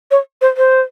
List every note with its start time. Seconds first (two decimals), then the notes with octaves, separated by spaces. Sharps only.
0.11 C#5
0.41 C5
0.57 C5